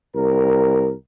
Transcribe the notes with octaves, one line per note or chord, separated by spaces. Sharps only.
C2 A#4